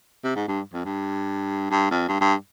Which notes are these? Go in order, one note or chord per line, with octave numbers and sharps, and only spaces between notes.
C3
G#2
G2
F2
G2
G2
F2
G2
G2